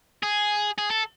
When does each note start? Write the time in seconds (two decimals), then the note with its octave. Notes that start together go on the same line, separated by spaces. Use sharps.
0.23 G#4
0.78 G#4
0.90 A4